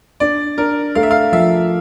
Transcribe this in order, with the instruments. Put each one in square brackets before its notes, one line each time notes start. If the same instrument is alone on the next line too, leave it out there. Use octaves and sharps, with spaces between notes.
[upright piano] D4 [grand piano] D5
[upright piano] D4 [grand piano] A#4
[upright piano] A3 [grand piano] F5
[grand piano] E5
F5
[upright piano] F3 [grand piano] E5